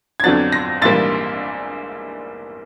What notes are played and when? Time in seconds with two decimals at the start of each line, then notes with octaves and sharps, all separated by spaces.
0.20 G#6
0.24 F2 D3 F#3 B3 D4 A6
0.52 A#6
0.82 A#1 G#2 E3 G3 A#3 A6